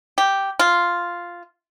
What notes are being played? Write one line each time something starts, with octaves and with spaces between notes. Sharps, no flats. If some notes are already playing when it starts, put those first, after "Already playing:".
G4
F4